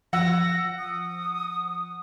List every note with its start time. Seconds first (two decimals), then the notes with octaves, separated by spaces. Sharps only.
0.13 F3 F#5 E6 A#6
0.78 D#6